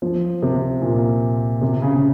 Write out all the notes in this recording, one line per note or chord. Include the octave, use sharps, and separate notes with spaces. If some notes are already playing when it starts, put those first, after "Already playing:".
F3
C3
A#2
C3
C#3
C#3